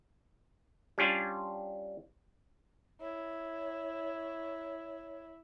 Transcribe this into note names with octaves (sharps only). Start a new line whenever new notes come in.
G3 C#4 D4 F4
E4 C#5